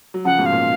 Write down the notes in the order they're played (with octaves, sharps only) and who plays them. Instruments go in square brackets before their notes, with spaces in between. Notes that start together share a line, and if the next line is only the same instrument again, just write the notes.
[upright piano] F#3
[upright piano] C#3 F3 [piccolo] F#5
[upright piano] G#2 B2
[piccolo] F5
[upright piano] A#2